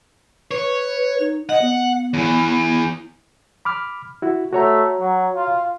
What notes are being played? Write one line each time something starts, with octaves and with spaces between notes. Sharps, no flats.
B4 C#5
D#4
D#5 F#5
B3
E2 E3
B5 D6 F6
E4 F#4
A3 F#4 C#5 A#5
F#3
F4